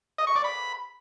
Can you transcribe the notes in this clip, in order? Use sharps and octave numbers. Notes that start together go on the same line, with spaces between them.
D#5
C#6
D5
B5